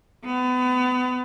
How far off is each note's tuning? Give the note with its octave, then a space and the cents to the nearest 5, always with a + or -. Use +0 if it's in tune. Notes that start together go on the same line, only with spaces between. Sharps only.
B3 +30